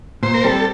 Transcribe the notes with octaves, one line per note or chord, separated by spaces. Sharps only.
A#2 C5
A#4
G3 C4 G4 A4